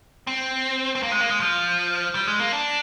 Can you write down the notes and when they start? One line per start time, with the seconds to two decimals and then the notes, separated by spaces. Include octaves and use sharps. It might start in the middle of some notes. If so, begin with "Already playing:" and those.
0.27 C4
0.95 C4
1.03 A#3
1.12 G#3
1.20 A#3
1.30 G#3
1.40 F3
2.15 G3
2.28 G#3
2.40 A#3
2.52 D4